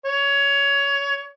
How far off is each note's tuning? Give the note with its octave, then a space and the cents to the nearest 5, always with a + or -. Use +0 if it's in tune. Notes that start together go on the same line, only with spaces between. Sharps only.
C#5 +20